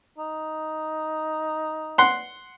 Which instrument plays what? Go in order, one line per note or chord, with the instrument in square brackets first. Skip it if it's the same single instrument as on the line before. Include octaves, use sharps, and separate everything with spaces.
[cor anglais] D#4
[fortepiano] F#5 C6